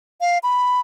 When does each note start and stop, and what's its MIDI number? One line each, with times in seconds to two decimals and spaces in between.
0.21 0.38 77
0.43 0.80 83